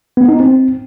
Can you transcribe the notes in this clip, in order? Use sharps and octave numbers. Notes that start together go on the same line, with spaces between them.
B3
D#4
C4